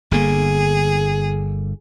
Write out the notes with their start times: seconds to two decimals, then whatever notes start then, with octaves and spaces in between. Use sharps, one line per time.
0.11 G1 D3 A#3 G#4